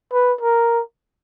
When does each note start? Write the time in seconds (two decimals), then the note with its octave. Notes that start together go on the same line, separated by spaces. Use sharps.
0.13 B4
0.41 A#4